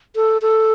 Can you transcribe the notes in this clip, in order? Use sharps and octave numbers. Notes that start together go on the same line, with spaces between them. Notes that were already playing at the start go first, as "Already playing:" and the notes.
A4
A4